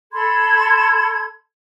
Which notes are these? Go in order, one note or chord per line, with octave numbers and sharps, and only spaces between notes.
A4 B5 C6 G#6